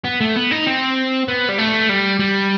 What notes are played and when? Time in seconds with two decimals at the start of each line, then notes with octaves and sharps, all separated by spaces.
0.05 B3
0.20 A3
0.36 B3
0.51 D#4
0.66 C4
1.28 B3
1.49 G3
1.58 A3
1.89 G3
2.20 G3